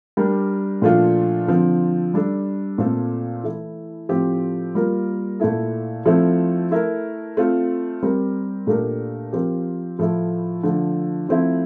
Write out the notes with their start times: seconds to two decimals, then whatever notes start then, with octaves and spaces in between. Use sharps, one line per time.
0.17 G3 D4 G4 A#4
0.82 A#2 F3 A3 D4 F4
1.47 D3 F3 C4
2.14 G3 D4 A4
2.78 A#2 A3 C4 F4 A4
3.44 E3 A3 E4
4.09 A2 F3 A3 C4 G4
4.75 G3 A#3 F4 A#4
5.40 A#2 A3 E4 A4
6.05 F3 A3 C4 E4 A4
6.71 A3 E4 A#4
7.37 A3 C4 F4
8.03 G3 C4 G4 A#4
8.67 A#2 A3 D4 G4 A#4
9.33 F3 C4 G4 A#4
9.99 A2 F3 A3 E4 A4
10.63 D3 F3 A3
11.29 F3 A3 C4 E4